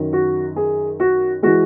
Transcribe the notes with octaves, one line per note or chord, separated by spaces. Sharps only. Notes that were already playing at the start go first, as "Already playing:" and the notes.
Already playing: F#2 D#3 F#3
F#4
G#4
F#4
E3 G#3 F#4